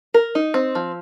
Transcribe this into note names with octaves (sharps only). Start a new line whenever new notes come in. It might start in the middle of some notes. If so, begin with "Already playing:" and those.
A#4
D#4
C4
F3